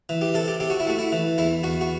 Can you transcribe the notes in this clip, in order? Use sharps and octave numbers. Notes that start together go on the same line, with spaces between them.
E3
G4
C3 A4
G4
C3 G4
F#4
E4
A3 F#4
E4
E3
E2 E4
E2 F#4
F#4